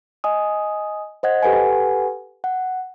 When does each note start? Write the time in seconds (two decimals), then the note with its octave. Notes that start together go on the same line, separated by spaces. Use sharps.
0.24 D#5 G#5 D#6
1.23 C5 D#5 F#5 G#6
1.42 G4 A4 B4 F#5 G#5
2.44 F#5